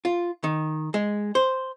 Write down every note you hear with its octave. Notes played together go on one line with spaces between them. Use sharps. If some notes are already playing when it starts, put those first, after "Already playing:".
F4
D#3
G#3
C5